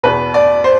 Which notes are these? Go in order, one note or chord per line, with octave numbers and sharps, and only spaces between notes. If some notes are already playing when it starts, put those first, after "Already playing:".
E2 B2 B4
D5
C5